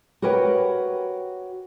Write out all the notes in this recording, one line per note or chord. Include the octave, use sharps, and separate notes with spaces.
F#4 G4 A#4 B4 C#5 G5